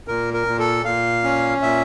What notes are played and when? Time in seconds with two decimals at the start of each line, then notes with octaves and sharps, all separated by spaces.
0.08 A#2 A#4
0.34 A#4
0.47 A#2
0.59 A4
0.85 A#2 F5
1.24 C#4
1.62 A#2 E5